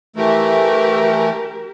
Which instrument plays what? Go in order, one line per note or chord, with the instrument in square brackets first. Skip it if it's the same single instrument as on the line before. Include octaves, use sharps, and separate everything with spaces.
[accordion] E3 A3 [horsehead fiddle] G4 A#4